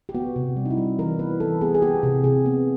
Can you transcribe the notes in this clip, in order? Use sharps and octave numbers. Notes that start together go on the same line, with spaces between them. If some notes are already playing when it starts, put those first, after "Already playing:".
G4
B3 F#4
C3
G3
D#4
E4
G3
E3 A#4
B3 B4
E3 A4
B3 G#4
G#4
B3 G4
C3
C3 G#4
B3